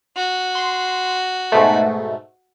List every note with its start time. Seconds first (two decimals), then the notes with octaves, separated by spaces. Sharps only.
0.16 F#4
0.55 C6
1.52 G#2 B2 A3